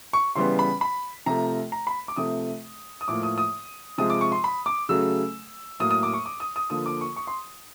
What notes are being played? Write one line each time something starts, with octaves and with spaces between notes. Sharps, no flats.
C#6
C#3 E3 G3 B3 C6
B5
B5
C3 F3 A3 A#5
A#5
B5
D6
C3 F3 A3 D#6
D#6
A2 F3 A#3 D6
D#6
D#6
C3 F3 G#3 D#6
D6
C#6
C6
B5
D6
C#3 F#3 A3 E6
A2 F#3 A#3 D#6
D#6
D6
C#6
D6
D#6
D#6
D3 F3 A#3 D#6
D6
C#6
C#6
C6